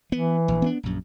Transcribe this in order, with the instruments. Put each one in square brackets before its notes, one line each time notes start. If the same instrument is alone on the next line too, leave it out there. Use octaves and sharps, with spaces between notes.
[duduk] E3 [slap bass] B3
[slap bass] A#1
B3 C4 D4
A#1 F#2